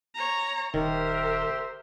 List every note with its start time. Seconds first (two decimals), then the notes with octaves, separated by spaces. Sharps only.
0.15 C#5 A#5
0.74 D#1 D#3 G4 A#4 C5 E5